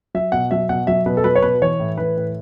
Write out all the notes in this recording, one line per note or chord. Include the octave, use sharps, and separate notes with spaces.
F#3 E5
B2 F#5
F#3 E5
B2 F#5
F#3 E5
B2 B4
A4
F#3 B4
C#5
B2 B4
E3 C#5
A2
E3 B4
A2